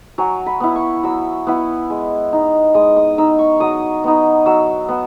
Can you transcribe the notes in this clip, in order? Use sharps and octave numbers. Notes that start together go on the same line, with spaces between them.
F#3 G#5
B5
B3 E4
C#6
F#3 E6
B3 E4
G#3
D#4
G#3 D#6
D#6
D#4 E6
C#6
F#3 D#6
B3 D#4
F#3 E6
B3